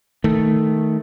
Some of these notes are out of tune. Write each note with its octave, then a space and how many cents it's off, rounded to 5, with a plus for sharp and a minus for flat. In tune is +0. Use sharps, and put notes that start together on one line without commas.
D#3 +15 A3 +0